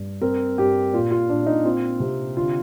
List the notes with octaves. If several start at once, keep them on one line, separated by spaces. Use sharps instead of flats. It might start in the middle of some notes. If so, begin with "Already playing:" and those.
Already playing: G2
C4 A#4
G2 G4
A#2 F4
F4
A#2 D4
D#4
C4 F4
C3
D3 F4